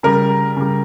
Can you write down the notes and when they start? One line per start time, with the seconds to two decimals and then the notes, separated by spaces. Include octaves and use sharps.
0.03 C#3 G3 A#4
0.57 C#3 G3